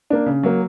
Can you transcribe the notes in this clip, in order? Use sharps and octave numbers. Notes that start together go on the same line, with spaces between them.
A#3 D4
C#3
F#3 A#3